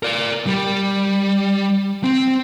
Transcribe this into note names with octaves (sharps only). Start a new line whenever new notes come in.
A#4 D5
G3
C4